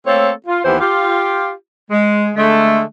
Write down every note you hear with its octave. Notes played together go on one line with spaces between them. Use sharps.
A3 A#3 C4 A4 C#5
F4
D#2 E3 B3 G4 C5
F4 G4
G#3
D3 G#3 A3